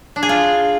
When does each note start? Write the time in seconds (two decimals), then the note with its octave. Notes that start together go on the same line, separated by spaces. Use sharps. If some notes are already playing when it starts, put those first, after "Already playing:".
0.16 D4
0.23 G#4
0.29 F4